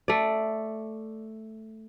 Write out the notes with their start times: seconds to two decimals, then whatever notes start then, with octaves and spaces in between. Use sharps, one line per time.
0.08 A3 D5